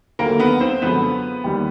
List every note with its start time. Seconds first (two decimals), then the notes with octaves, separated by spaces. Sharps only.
0.19 D#2 D3 F#3 A3 A#3 A#4
0.40 B3 B4
0.60 C4 C5
0.82 F#2 D3 F3 G#3 B3 B4
1.44 D#2 D#3 G3